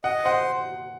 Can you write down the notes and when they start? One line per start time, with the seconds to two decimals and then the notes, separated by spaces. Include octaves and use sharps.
0.04 D#5 F#5
0.25 C5 F#5